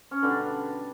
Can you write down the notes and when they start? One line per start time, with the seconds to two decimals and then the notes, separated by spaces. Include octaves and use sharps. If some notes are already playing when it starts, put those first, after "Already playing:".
0.11 C#4
0.22 B2 D3 G3 D4